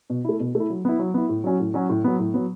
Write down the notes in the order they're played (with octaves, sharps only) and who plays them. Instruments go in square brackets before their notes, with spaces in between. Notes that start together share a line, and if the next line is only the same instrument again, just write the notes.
[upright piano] B2
A3 E4
B2
A3
E4
F#3
B3 E4
F#3
B3 E4
A2
F#3 C#4 F#4
A2
F#3 C#4 F#4
A2
F#3 B3
A2
F#3 B3